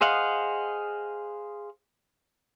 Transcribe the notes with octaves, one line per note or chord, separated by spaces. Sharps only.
G#4 C5 D#5 F5 F#5